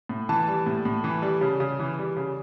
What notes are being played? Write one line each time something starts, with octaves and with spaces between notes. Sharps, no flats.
A2
E3 A5
G3
A2
A2
E3
G3
C#3
C#3
E3
G3
C#3